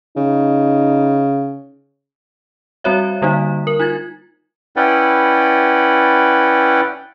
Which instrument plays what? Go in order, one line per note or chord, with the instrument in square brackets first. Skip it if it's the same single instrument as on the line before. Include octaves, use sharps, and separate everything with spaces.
[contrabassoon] C#3 [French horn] D#4
[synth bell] G3 C4 F#4 C#5 E5
D3 G3 A#3 D#4
A#4 F#7
D#4 F4 G#6 A6
[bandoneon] C#4 E4 B4 D5 F#5 G5